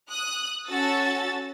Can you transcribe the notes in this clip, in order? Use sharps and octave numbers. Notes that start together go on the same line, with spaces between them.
D#6 F#6
C#4 F#4 A4 E6 A6